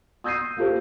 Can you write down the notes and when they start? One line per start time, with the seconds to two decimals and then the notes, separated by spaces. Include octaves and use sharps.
0.24 D#6 E6 G6 A#6 C7 D#7
0.57 A#3 F4 G4 A4 C5